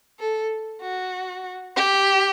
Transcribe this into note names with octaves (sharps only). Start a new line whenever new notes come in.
A4
F#4
G4